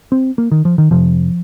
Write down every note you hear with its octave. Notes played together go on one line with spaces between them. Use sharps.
C4
A#3
D#3
F3
D#3
F2 C3 F3